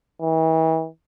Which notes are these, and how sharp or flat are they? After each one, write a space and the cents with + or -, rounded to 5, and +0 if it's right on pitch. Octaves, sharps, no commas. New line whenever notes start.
E3 -40